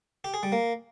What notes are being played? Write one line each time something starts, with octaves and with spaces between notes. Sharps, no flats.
G4
G#4
G3
A#3